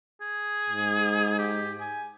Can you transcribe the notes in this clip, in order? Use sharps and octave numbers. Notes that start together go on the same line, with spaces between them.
G#4
G#2
G4
G#5